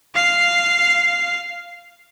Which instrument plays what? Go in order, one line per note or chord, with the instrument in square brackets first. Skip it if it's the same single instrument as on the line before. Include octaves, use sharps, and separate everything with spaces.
[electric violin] F5 C7